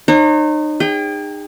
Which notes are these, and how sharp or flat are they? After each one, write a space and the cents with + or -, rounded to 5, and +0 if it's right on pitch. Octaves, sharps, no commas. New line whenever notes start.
D#4 -30 C#5 -45
G#4 -35 G5 +0